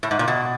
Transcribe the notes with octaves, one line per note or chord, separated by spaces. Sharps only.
A2
G#2
A#2
B2